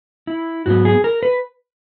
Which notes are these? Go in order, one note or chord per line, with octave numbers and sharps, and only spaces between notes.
E4
G#2 F#3 B3 F#4
G#4
A#4
B4